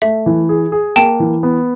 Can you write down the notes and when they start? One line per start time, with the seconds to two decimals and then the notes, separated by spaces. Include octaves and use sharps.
0.02 A3 E5
0.26 E3
0.49 G#4
0.72 G#4
0.96 A#3 G5 A5
1.20 E3
1.43 B3